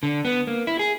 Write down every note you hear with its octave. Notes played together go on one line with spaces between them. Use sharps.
D3
B3
A#3
E4
G#4